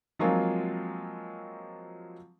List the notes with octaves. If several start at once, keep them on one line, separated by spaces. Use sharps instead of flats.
F3 F#3 G#3 A#3 C4 F4